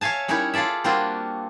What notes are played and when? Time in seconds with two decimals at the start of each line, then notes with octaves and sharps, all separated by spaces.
0.01 C#5 E5 F5 G#5 A5
0.28 G3 C#4 D#4 E4 A#4 C#5
0.54 F4 G#4 A4 D5 E5
0.84 G3 A#3 C4 D4 F4 F#4